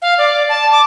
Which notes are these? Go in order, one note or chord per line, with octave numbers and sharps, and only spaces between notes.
F5
D5
A5
D6